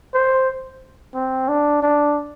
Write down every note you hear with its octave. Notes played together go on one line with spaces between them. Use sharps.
C5
C4
D4
D4